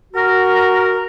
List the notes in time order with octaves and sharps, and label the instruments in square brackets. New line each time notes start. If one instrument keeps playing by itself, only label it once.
[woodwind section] F#4 A#4